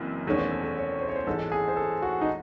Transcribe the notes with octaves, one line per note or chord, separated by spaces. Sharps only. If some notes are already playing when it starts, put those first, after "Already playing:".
Already playing: F#1 F#2 E3 C4
E1 E2 D#3 A3 C#4 G#4
C5
A4
A4
C#5
C5
C#5
C5
A1 G#2 E3 G#3 A4
G#4
C5
A4
F#4
D#4